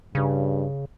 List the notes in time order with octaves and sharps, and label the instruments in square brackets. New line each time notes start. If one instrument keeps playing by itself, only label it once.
[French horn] G2 [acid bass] C#3